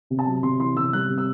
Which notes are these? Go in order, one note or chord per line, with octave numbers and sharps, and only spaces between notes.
C3
A5
F#3
C3 C6
E3 C6
C3 E6
G3 F#6
C3
E6